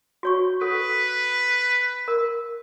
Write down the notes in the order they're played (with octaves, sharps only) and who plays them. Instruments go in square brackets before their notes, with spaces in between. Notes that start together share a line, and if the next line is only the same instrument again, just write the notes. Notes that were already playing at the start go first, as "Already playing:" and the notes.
[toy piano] F#4 C#5 C#6
[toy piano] A4 [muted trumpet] B4
[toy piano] A#4